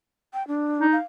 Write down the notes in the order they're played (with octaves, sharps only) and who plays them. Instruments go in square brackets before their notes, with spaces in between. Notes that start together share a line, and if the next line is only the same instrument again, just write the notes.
[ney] G5
D4
[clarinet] D#4
[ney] F5